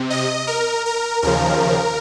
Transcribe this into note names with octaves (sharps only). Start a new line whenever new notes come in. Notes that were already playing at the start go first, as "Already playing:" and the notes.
Already playing: C3
D#5
A#4
A#4
D#2 C#3 F3 A#4